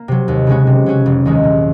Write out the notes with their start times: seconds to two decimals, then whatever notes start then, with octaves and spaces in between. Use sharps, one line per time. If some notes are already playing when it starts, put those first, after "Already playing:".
Already playing: A#3
0.08 C3 F#3
0.28 D#2
0.47 C#3 G#3 C#4 F#4
0.67 C3
0.86 F#3 C#4 F#4
1.06 F1
1.25 D#2 D#3 G#3
1.44 A#2